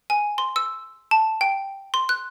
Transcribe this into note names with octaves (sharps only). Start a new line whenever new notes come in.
G#5
C6
E6
A5
G5
C6
F#6